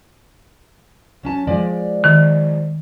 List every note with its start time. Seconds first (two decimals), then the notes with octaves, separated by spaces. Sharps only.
1.23 F#3 C#4 A5
1.47 F3 G#3 D5
2.04 D#3